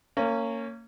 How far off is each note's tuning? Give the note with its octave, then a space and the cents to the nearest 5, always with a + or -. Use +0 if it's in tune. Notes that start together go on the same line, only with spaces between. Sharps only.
A#3 -25 C#4 +0